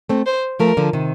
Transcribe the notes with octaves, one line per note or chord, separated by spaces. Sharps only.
A3 C4
C5
F3 A3 A#4
D3 F3
C3 D#3